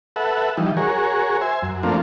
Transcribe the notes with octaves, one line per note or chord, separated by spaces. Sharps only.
A4 B4 E5 F#5
E3 F3 G3 D#4
F#4 G#4 A#4 C#5
C5 E5 G#5
F#2
F3 A3 A#3 C4 D4 F4